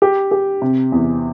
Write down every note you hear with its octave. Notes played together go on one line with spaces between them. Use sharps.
G4
G4
C3
E2